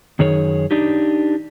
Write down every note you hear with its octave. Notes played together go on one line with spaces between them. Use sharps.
F#2 D#3 G#4 C#5
D4 D#4 G4